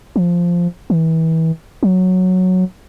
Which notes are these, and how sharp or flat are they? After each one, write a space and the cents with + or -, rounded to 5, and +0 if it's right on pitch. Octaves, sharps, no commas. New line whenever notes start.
F3 -5
E3 -30
F#3 -5